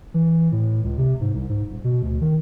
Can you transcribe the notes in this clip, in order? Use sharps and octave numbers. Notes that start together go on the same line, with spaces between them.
E3
A2
C#2
C3
G#2
C2
G#2
D#1
B2
D2
D#3